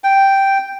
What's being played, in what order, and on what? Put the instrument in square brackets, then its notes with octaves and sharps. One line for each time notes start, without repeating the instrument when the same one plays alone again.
[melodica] G5